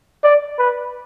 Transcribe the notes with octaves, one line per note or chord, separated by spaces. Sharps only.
D5
B4